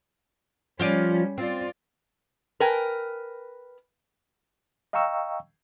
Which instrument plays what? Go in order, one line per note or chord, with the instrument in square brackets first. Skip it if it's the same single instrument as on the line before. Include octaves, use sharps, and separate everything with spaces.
[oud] F3 F4 D5 [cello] G3 C#4
[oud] C4 [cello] F4 D5
[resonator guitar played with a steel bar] A#4 B4 G5 G#5
[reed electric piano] D#5 F5 G5 A#5 C#6 E6